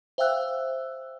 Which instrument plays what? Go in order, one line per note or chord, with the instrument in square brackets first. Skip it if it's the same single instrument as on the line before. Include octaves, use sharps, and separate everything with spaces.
[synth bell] C5 E5 F5 G5 E6 F#6